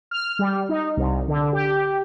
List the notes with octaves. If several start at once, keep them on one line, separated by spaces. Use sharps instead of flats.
F6
G3
D#4
C2
D3
G4